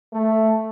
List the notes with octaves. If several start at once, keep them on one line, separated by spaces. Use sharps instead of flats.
A3